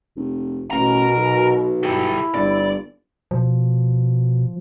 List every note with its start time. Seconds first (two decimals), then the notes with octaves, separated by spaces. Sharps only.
0.16 F1
0.71 A1 B2 A#4 A#5
1.16 B1
1.83 E4 G4 A4
2.34 G1 D5
3.31 B2 F3